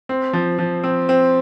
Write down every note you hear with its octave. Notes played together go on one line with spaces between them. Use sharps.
C4
F3
F3
C4
C4